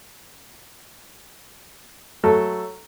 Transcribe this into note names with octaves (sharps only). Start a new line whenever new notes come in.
F#3 A3 A4